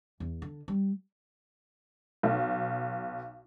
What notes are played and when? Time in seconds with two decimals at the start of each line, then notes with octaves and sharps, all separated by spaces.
0.20 E2
0.42 D3
0.68 G3
2.23 B1